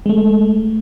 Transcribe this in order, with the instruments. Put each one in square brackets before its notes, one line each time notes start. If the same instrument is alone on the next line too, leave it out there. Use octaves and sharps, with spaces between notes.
[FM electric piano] G#3 A3